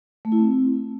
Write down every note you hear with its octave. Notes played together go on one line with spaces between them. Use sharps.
A3
E4
C4